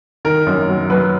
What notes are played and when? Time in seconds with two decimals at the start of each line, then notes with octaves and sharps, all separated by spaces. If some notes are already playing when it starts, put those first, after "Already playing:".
0.25 D#3 A#4
0.47 F#2
0.68 F#3
0.90 F#3 B4